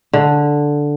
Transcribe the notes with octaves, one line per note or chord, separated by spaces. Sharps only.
D3